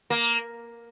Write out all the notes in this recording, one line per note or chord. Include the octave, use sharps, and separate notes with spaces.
A#3